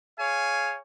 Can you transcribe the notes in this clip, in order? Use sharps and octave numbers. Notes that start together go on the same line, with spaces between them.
G#4 C#5 F5 G#5